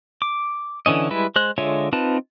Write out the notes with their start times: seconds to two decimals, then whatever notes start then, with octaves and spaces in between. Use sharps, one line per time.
0.22 D6
0.86 D3 E3 C#4 D#5
1.11 G3 G#3 E4 B4
1.36 G#3 C5 F#6
1.58 D3 G#3 F4 C#5 E5
1.93 C4 D#4 F4 B4 A5